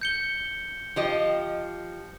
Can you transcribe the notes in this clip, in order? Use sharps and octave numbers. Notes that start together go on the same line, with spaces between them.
G6 C#7 G7
F3 G4 D#5